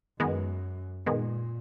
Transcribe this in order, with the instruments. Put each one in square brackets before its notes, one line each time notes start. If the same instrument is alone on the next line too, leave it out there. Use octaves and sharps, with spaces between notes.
[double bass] F#2 [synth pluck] D#3 G#3 B3
[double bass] A#2 [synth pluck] D#3 G#3 B3